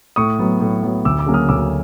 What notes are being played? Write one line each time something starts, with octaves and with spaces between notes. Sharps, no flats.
A2 C#6 D#6
F#3 B3
A2
F#3 B3
D2 D6 E6
D6 E6
C#3 F#3 A#3 C#4
D#6 F6
D2 D6 E6